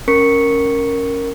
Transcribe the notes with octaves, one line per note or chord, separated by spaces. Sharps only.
C#4 A#4 C#6 B6 C#7